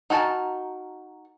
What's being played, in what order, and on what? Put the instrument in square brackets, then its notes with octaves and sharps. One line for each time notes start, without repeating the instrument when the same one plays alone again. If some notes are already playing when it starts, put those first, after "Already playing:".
[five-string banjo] D#4 F#4 A#4 G#5 A5